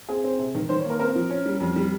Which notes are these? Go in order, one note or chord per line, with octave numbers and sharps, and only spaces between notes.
C4 G#4
C4
C3
D#3
D#3 C5
C#5
A#3 A#4
C4 A#4
F3
C#4
G3
F2
G3